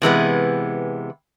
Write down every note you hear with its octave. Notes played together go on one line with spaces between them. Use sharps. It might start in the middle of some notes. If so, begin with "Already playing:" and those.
C3 E3 G#3 B3